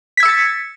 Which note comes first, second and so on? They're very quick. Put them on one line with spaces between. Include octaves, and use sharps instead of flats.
B6 G#6 E6 C#7 A6